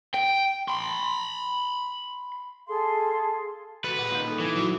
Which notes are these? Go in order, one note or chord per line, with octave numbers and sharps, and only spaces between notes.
G5
B5 C6
G#4 A4 F5 C6
F#4 A4 B4
A#2 G#3 F#5
A#2 D#3 C6 G6
D#4 A4
E3
F#3 D#4 F#4